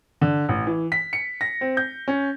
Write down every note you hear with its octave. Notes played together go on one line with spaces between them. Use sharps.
D3
A1
E3
B6
C#7
A#6
C4
G6
C#4